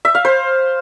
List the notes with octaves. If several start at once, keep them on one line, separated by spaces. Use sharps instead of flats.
E5
F5
C5